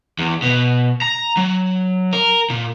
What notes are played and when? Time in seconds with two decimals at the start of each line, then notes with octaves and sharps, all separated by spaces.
0.19 E2
0.42 B2
1.02 A#5
1.37 F#3
2.13 A#4
2.50 A#2